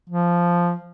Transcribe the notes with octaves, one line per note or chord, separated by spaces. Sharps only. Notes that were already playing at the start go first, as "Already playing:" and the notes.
F3